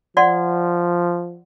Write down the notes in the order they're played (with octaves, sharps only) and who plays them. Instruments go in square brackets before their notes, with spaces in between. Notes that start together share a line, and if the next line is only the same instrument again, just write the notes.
[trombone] F3 [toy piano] D5 F#5 C6